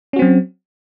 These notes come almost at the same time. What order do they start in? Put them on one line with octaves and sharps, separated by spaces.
C#4 F#4 C4 F#3